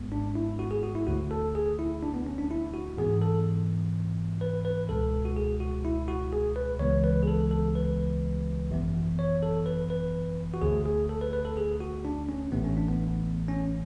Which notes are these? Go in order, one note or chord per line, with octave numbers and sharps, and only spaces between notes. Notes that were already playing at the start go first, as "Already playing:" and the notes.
Already playing: G#1 G#2 G#3 B3
D4
E4
F#4
G#4
F#4
E4
D2 D3 A3 F#4
A4
G#4
E4
D4
B3
C#4
D4
E4
F#4
G#2 E3 B3 G#4
A4
B4
B4
C#2 B2 G#3 A4
F#4
G#4
F#4
E4
F#4
G#4
B4
C#2 C#3 E3 G#3 B3 C#5
B4
G#4
A4
A4
B4
G#1 F#2 E3 B3
C#5
A4
B4
B4
F#4
D2 D3 A3 G#4
G#4
A4
B4
B4
A4
G#4
F#4
D4
C#4
A1 A2 E3 A3 B3
C#4
D4
B3
C#4